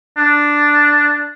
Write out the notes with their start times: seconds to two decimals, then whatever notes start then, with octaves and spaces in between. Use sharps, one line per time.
0.17 D4